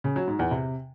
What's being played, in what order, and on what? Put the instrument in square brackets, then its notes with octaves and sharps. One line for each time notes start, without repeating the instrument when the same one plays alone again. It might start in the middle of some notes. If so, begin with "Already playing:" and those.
[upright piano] C#3
F#3
G#2
E2
C3